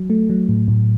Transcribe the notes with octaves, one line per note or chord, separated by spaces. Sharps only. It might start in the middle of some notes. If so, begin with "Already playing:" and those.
Already playing: F#3
A3
F#3
A2
A2